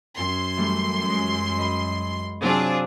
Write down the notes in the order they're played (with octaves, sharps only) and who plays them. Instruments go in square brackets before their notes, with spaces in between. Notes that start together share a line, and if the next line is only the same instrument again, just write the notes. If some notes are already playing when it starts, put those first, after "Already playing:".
[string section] F#2 C6
[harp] E3 G3 A3
G#3
D#5 B5
[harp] C3 F#3 C4 [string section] D4 F4 G#4